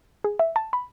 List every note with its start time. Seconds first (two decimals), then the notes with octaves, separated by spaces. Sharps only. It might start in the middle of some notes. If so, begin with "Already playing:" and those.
0.24 G#4
0.39 E5
0.56 A5
0.73 B5